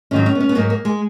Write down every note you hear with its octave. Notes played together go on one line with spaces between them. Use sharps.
G#2 D#3 F#3 C#4
C#4
B3
C#4
B3
G#2 F#3 A#3
A#3
G#3